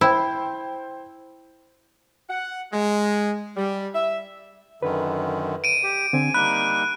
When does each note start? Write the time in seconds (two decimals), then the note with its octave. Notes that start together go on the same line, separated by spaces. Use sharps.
0.01 E4 C5 G5
2.30 F#5
2.73 G#3
3.57 G3
3.94 E5
4.83 F#2 D3 D#3 B4
5.64 D7 D#7
5.83 G4
6.13 D3 C4 G#5
6.34 G3 A#3 D#4 B5 F#6